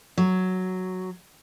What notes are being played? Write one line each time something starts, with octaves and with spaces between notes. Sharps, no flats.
F#3